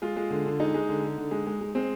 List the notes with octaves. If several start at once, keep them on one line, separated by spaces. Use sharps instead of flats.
G#3 F4
G#3
D3
D3
G#3 D#4
G#3
D3
D3
D3
G#3
G#3
G#3
G#3 C4